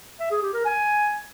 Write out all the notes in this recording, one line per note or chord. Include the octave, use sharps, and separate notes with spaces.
E5
G#4
G4
A#4
G#5